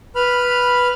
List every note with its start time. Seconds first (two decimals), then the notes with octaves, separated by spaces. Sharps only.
0.16 B4 B5 F6